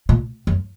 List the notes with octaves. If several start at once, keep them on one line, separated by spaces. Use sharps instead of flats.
A#2
F#2